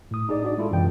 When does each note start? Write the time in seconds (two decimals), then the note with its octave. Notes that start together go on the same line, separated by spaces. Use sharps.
0.11 A2 D#6
0.29 D#4 G#4 D5
0.42 D4 F#4 D5
0.58 G#3 E4 F4 A4
0.71 F#2 C3 E3 G5